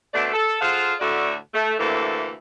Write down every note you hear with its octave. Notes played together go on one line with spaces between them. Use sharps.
B2 A3 C4 D4 D5
A4
F4 G#4 A4 C5 F5 F#5
D2 A2 D3 A3 F#4 D5
A3
D2 C3 E3 A#3 A4 E5